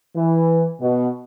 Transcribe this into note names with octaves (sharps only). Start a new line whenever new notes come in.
E3
B2